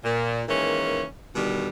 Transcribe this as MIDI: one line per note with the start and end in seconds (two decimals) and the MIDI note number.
0.04 0.42 46
0.48 1.03 51
0.48 1.03 52
0.48 1.03 56
0.48 1.03 58
0.48 1.03 61
1.36 1.69 47
1.36 1.69 50
1.36 1.69 51
1.36 1.69 55